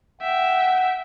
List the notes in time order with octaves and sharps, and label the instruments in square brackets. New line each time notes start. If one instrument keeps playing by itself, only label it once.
[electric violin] E5 G5 [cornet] F#5